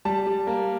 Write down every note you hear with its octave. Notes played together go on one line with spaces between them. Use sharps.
G3 A5
G3
A#3